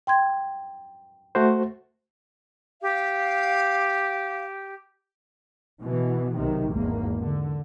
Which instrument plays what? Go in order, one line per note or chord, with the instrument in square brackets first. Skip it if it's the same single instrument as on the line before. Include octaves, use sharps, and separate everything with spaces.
[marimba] G5 C6 G#6
[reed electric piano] A3 F#4 C5
[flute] G4 [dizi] F5
[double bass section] B2 E3
B1 C3 D#3
G#1 E2 A#3
D3